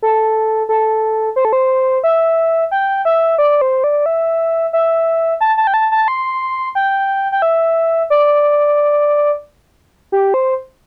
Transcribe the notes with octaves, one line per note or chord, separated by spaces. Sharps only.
A4
A4
C5
A4
C5
E5
G5
E5
D5
C5
D5
E5
E5
A5
A5
G5
A5
A5
C6
G5
G5
E5
D5
G4
C5